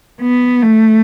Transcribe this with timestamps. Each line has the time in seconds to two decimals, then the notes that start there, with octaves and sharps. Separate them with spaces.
0.21 B3
0.63 A3